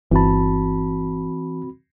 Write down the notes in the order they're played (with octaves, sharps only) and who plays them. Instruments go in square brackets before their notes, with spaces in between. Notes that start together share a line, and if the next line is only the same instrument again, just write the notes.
[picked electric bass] G1 [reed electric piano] E3 A5 [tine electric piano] C4 F#4 B5